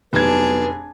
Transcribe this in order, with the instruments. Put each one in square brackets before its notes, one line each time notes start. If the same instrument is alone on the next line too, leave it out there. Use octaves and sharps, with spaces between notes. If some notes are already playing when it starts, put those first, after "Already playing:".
[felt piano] F1 G#6 [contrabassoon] B1 [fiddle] D4 G#4 [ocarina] B4